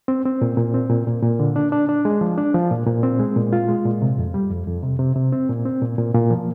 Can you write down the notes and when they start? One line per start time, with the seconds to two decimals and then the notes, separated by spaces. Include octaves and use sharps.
0.08 C4
0.25 C4
0.42 A#2
0.57 A#2
0.74 C4
0.90 A#2
1.07 A#2
1.23 A#2
1.39 D3
1.56 D4
1.72 D4
1.89 D4
2.05 G#3
2.21 F3
2.38 D4
2.54 F3
2.71 A#2
2.87 A#2
3.03 C4
3.19 G#3
3.36 A#2
3.53 F4
3.69 G#3
3.85 A#2
4.02 C3
4.18 F2
4.34 G3
4.51 F2
4.67 F2
4.83 C3
4.99 C3
5.16 C3
5.33 C4
5.49 A#2
5.65 C4
5.82 A#2
5.99 A#2
6.14 A#2
6.30 F3